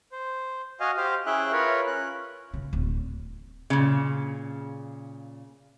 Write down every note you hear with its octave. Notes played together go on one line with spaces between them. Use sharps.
C5
F#4 D#5 F5 G#5
G4 C5 F5
C#4 E4 G#4 E5 G5 F#6
F4 A#4 B4 C#5
C#4 F#6
C#3
D1
A#2 C#3